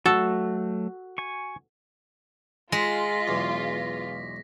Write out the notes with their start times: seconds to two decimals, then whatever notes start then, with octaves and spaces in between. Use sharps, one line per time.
0.06 F#3 A3 F#4 A4
1.18 G#5 C#6
2.72 G#3 F4 A#6 B6
3.28 B1 E2